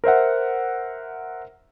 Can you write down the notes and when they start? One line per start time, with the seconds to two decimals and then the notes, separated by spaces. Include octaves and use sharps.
0.04 A#4 C5 E5 F#5